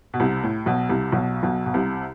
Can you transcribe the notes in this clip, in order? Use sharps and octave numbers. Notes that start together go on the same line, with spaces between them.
B2
C2 C3
A2
B1 B2
C2 C3
B1 B2
B1 B2
B2
C2 C3